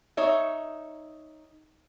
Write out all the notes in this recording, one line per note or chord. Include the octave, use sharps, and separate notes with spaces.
D#4 C#5 E5